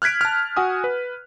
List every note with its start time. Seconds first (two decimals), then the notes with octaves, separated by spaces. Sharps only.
0.02 F6 F#6 G#6 B6 D7
0.21 A5 F6
0.56 F#4 F#5 G#5 D#6
0.84 B4